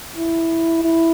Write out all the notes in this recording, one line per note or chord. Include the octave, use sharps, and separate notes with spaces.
E4
E4